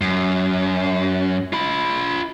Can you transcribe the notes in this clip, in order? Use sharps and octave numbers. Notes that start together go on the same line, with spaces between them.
F#2
F4 B5